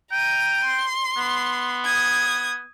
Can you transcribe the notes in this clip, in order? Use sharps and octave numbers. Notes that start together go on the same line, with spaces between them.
G5 A#5 D#7
C6
B3
D#6 G#6